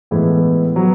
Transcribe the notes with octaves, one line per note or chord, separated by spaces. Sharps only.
A2 E3 G#3 B3 E4
F#3 B3